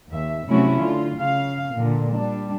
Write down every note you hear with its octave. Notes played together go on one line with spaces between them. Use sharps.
D#2 E5
C3 F#3 A3 C#4 E4 F#4
D3 F4
C#3 F5
A#2 D3
G3 D4